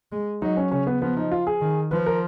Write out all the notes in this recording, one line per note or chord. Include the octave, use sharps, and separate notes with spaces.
G#3
F#3 D#4
C#4
C#3 C#4
B3
F3 B3
D#4
F4
G#4
D#3
F3 B4
A#4